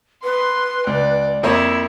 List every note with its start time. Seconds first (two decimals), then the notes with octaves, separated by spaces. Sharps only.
0.24 B4 C6
0.87 C#2 D5
1.43 F2 A#3 E4 C#5 E5